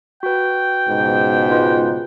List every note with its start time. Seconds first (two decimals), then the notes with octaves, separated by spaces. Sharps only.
0.23 F#4 B4 G5
0.88 C#2 G#2 B2
1.51 D#4 F4 B4